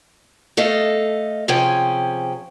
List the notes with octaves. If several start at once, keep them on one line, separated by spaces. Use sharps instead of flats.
A3 A4 D#5 F5
C3 F3 C#4 G#4 G5